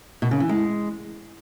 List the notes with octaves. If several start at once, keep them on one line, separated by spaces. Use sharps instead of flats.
B2
C#3
E3
G#3